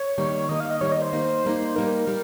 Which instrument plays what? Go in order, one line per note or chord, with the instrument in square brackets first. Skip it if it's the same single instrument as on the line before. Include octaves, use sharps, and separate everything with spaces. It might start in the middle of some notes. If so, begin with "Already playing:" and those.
Already playing: [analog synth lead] C#5
[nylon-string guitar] D#3 G3 A#3
[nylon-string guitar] D#3 G3 A#3 [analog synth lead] D#5
[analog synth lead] F5
D#5
[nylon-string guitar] D#3 G3 A#3 [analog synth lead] C#5
[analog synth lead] D#5
C5
[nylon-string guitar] G3 A#3 D#4
G3 A#3 D#4
[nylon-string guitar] G3 A#3 D#4 [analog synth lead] A#4
[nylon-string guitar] G3